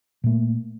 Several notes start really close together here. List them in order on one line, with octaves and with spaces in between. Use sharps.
A#2 A3 A#3